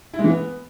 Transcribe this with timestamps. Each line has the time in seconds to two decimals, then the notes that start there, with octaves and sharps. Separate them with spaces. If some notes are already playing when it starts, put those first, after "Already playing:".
0.14 E4
0.19 G#3
0.24 E3
0.29 B3